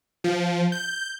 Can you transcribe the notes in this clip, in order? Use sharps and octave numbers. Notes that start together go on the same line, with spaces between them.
F3
G6